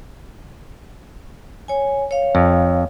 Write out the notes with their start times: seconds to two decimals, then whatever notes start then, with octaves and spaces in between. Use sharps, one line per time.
1.68 C#5 G#5
2.11 C#5 F5
2.35 F2